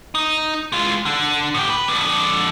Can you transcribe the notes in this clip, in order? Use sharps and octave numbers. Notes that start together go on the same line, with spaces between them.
D#4
G#3 F4
D3
A2 G4
B4
F2 D3